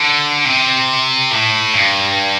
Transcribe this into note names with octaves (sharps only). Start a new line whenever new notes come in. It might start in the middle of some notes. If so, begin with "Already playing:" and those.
Already playing: D3
C3
A2
G2